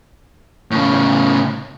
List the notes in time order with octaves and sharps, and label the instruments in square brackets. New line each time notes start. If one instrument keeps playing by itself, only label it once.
[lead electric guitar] A2 C#3